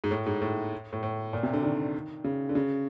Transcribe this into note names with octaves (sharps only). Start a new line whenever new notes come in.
G#2
A2
G#2
A2
A2
A2
A#2
C3
D3
D#3
C#3
D3
C#3